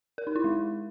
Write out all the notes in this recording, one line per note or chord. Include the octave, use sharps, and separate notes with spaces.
A#4
D#4
E4
G#3